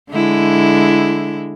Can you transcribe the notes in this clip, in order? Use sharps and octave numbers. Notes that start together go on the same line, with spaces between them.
D3 G#3 E4